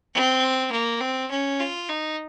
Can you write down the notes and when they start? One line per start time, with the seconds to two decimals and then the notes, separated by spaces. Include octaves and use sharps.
0.14 C4
0.72 A#3
1.01 C4
1.31 C#4
1.60 F4
1.89 D#4